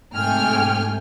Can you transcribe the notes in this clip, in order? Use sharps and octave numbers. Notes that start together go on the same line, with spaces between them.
G#2 C3 A3 G5 G#5 F6